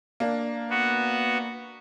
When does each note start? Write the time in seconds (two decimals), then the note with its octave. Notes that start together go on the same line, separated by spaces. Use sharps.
0.20 A#3 D4
0.70 B3 F#4